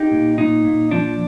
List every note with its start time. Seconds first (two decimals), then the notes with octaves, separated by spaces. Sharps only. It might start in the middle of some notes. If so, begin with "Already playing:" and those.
Already playing: D#4 G4
0.12 A#2
0.38 A#2 D#4
0.65 A#2
0.91 F3 D4